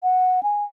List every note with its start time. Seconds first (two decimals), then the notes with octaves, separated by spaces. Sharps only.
0.03 F#5
0.43 G#5